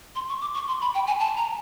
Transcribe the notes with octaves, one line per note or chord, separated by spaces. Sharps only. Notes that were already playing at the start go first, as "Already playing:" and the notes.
C6
C#6
D6
C#6
C6
B5
G5
G#5
A5
A#5